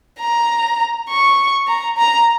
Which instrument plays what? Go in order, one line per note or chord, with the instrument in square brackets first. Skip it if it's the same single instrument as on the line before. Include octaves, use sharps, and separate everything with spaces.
[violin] A#5
C#6
A#5
A#5